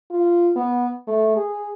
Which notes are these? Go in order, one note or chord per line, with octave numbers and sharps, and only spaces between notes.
F4
B3
A3
G#4